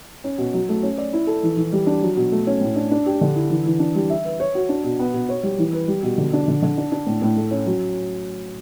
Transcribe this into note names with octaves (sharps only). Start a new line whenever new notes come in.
C#4
B2
F#3
A3
C#4
D5
E4
A4
E3
E3
G3
D4
F#3
B2
A3
C#4
A2
D4
D4
G4
D3
E4
E3
E3
D4
G3
E5
B4
C#5
F#4
D4
B2
B3
B2
C#5
G3
E3
B4
G3
B2
D3
D4
D3
D3
D4
D4
A2
A2
A3
C#4
F#3